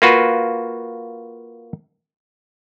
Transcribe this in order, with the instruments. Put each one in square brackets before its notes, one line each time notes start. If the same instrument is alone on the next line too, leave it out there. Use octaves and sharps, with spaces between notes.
[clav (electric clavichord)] A#3 F4 F#4 B4